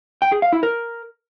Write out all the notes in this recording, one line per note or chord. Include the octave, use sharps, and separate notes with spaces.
G5
G#4
F5
E4
A#4